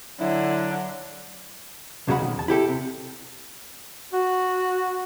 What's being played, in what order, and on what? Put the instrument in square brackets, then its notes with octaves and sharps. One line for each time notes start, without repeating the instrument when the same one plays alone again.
[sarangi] D3 [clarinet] F#3 [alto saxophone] E4
[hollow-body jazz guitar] E2 C#3 F#3 G#3 F#5 B5
B1 D#3
E2 A5
E4 G4 A4
C3
[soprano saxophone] F#4